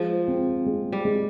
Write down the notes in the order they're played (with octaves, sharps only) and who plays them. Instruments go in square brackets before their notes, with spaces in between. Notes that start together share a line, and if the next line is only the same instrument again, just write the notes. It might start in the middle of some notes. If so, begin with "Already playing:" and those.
Already playing: [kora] F3 [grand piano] G#3
[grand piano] C4
G#3
[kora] G3
[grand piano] G#3